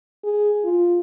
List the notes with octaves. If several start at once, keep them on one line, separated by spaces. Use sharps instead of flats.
G#4
F4